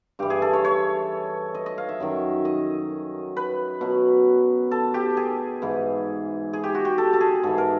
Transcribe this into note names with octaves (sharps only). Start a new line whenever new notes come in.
G2 E3 G4
G#4
A4
C#5
C#5
D#5
D#5
F5
E5
F#2 D#3 F#3
D#5
B4
B2 F#3
A4
G4
G#4
G#2 E3
G#4
G4
F#4
G4
A4
A4
G#4
G#2 E3 A4
A#4